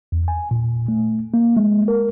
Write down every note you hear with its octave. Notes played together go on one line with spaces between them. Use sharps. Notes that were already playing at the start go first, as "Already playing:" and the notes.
E2
G#5
A#2
A3
A#3
G#3
A#4